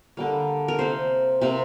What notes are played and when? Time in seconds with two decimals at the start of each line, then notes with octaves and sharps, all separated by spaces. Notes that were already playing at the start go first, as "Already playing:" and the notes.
0.17 D3 G3 A#3
0.68 A#4
0.79 C3 A#3 C5
1.42 C3 A#3